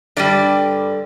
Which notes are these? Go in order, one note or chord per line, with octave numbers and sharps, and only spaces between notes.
G2 D3 G3 D5